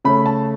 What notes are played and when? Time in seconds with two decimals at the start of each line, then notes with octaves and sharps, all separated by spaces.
0.04 C#3 A3 C#4 B5
0.26 A5